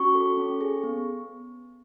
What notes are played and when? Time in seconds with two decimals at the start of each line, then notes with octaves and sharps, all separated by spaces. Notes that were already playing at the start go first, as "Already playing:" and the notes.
Already playing: C#4 F#4 C#6
0.15 A4
0.37 C#4
0.61 G#4
0.83 B3